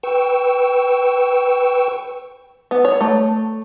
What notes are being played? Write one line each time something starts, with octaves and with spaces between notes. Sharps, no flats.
B4 G5 C#6 E6
B3
C#5
A3